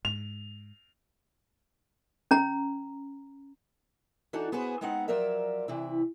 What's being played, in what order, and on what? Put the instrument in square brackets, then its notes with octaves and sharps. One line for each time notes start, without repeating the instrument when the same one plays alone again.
[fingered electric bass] G#2 [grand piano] F7
[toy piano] C#4 A#5
[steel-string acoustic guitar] E3 D4 D#4 F#4 A4
B3 F#4 G#4 B4 C5
G#3 B3 C4 D#4 F#5
F3 F#3 A#4 D5 E5
C3 E3 E4